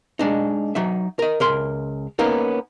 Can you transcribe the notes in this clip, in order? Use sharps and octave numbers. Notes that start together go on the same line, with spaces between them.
G#3 D4 D#4
F#3 D#4 E5
A#4 D#5
C#2 A#4 C6
A#3 B3 C#4 D#4 A#4